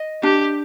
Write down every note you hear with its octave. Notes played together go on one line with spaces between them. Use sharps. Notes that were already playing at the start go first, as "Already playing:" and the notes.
Already playing: D#5
D4 G4